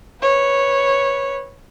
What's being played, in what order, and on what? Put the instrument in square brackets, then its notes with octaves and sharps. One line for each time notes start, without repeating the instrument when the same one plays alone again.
[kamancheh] B4 C#5